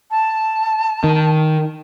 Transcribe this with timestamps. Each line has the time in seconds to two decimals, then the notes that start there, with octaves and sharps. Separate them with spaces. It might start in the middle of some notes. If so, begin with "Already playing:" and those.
0.10 A5
1.04 D#3